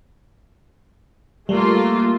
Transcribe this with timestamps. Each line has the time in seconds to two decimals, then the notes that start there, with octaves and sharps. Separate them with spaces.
1.49 G3 A3 A#3 F4